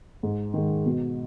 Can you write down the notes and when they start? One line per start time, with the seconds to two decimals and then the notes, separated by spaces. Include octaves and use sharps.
0.23 G#2
0.54 D#3 G#3
0.86 B2